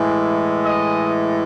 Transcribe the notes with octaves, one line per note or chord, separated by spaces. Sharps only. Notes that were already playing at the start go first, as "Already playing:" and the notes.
Already playing: A2 E3 G#3
D#5